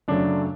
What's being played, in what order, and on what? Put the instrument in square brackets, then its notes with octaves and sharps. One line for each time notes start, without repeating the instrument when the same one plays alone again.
[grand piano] F#2 C#3 F#3 A3 D4